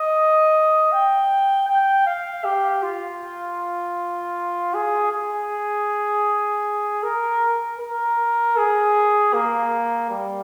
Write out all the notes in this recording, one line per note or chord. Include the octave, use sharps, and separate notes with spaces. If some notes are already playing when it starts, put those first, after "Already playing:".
Already playing: D#5
G5
G5
F5
G4
F4
G#4
G#4
A#4
A#4
G#4
A#3
G3